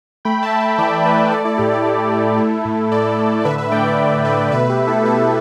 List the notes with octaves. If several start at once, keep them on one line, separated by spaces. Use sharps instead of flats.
A3 G5 B5
E5 A5
A3
E5 A5
E3 D5 G5
A3 B4 E5
A3 A4 D5
E4 A4
A2 G4
E4 A4
A3
A3
A3
A2
A2 A4 D5
A2
D5
D3 B4 E5
B4 E5
A3 D5 G5
D5 G5
D3
A3 B4 E5
B2 B4 E5
G4 B4
B2
E4 A4
B2 E4 A4